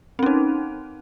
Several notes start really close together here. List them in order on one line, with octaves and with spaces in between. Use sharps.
C4 C#4 D#4